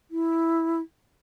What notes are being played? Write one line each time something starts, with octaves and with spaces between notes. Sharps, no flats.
E4